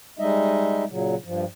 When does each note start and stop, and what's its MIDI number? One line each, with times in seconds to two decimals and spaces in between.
0.19 0.84 55
0.19 0.84 56
0.19 0.84 63
0.19 0.84 75
0.19 0.84 76
0.90 1.15 46
0.90 1.15 49
0.90 1.15 54
1.24 1.45 43
1.24 1.45 53